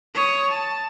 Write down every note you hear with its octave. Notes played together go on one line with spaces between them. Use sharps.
C#5 D#6
A5